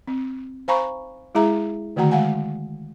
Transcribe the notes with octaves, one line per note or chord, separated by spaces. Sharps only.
C4
C5 F5 G#5 A#5 B5 C#6
G#3 E4 G#4 E5 A#5
D3 D#3 A3 F#4 F#5 A#5
G#3 F5 F#5 G#5